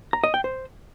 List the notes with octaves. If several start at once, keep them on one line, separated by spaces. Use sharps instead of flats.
A#5
D#5
G5
C5